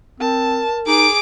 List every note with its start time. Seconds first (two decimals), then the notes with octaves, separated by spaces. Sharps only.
0.20 C4 A#4 A5
0.87 D#4 G#4 D6 D7